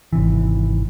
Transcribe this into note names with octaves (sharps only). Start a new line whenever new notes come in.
G#1 C3 E3